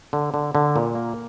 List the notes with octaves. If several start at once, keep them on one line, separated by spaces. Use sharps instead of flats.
D3
D3
D3
A#2
A#3